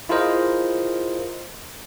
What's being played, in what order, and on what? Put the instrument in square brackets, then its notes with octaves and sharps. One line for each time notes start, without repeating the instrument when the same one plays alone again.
[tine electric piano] E4 F4 G#4 A#4 C5 D#5